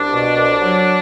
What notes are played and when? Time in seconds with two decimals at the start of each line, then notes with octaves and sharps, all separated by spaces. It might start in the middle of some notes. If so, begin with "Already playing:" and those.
Already playing: C2 D4
0.12 B2
0.36 C2
0.60 F#3